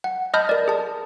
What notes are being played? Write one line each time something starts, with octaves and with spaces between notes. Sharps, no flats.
F#5
D#5 A5 B5 D#6 F6 G6
A#4 D5
G#4 A5